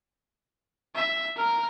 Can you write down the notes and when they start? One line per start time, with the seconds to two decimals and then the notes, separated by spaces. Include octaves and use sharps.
0.95 E5
1.36 A#4 F6